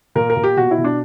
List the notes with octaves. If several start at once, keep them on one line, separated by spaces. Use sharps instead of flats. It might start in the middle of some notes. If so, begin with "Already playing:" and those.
A#2 A#4
A#4
A#2
G4
B2 F#4
E4
B2
D4